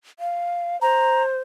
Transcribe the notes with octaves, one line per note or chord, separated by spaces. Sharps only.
F5
C5 A#5